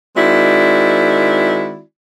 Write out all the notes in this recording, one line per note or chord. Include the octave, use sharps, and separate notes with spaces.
D#3 G#3 C4 E4 F#4 D5